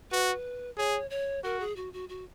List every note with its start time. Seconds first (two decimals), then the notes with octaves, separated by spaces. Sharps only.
0.11 F#4 B4
0.77 G#4 C#5
1.10 C#5
1.43 F#4 A#4
1.60 G#4
1.76 F#4
1.93 F#4
2.09 F#4